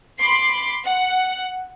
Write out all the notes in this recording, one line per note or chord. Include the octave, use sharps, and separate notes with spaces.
B5 C6 D6 C7
F#5